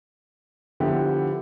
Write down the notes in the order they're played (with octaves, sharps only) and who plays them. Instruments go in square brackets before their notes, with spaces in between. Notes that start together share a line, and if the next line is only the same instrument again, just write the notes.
[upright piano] D3 F3 B3 E4 G4